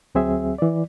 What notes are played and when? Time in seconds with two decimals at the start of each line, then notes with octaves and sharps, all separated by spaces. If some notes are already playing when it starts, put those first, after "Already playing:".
0.15 D2 F#3 C4 G#4 E5
0.58 E3 D5